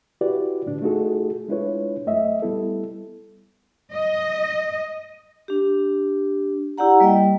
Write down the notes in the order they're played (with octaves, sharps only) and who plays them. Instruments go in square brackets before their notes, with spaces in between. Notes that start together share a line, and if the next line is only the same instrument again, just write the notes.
[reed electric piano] E4 F#4 G4 B4 D5
A2 D3 D4
A3 D#4 F4 F#4 G#4 A4
G#3 D4 E4 F4 B4 C#5
F#2 A3 D#5 E5
G3 B3 E4 A4
[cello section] D#5
[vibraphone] D4 G4
E4 G4 D5 F#5 A#5
G3 A#3 D#5 G5